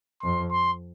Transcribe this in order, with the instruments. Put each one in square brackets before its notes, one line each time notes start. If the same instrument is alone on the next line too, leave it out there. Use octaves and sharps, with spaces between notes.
[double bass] F2 [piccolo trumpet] C6
[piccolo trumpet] C6